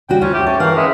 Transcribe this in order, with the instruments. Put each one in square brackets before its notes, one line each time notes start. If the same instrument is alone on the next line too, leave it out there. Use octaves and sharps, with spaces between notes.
[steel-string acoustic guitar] C#3 G3 F#4 [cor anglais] G5
[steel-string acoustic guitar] D2 F4 [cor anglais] C#4
[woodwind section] C#4 E5 G5 [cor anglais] G4
[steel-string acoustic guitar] A4 [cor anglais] C#5
[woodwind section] E3 [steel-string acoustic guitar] A#4 F#5 [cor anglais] F5
[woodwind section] C#3 E5 [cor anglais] G#3